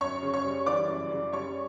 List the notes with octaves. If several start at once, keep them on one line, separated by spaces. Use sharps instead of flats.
F#2 C#5 C#6
C#3
C#5 C#6
G3
E3 D5 D6
F#2
C#3
G3 C#5 C#6